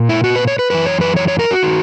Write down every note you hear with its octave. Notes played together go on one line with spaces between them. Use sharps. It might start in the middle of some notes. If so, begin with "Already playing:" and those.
Already playing: A#2
E4
F#4
B4
C#5
B4
F#2 E3 B4
C#5
B4
C#5
C#5
A#4
F#4
D#3